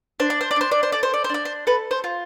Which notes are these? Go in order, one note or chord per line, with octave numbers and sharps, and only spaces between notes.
D4 C5
D5
C5
D5
D4 C5
D5
C5
A4 D5
C5
D5
C5
D4 D5
C5
A4 B4
C5
F4